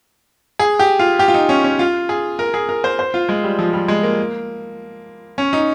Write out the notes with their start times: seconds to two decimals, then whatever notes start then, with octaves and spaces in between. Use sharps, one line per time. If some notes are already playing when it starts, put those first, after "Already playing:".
0.59 G#4
0.79 G4
0.99 F4
1.19 G4
1.28 F4
1.34 D#4
1.49 C#4
1.64 C#4
1.79 F4
2.09 G#4
2.39 A#4
2.54 G#4
2.69 A#4
2.84 C5
2.99 C5
3.14 F4
3.29 G#3
3.44 G3
3.59 F3
3.73 G3
3.88 G#3
4.03 A#3
5.38 C#4
5.53 D#4